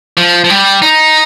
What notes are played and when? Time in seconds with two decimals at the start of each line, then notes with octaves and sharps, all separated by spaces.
0.17 F3
0.44 F3
0.50 G3
0.82 D#4